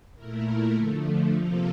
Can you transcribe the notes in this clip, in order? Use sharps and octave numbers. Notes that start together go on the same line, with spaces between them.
A#2 A3 E4 A#4
D3 F3 A3
C3 F3 A#3 F4 A4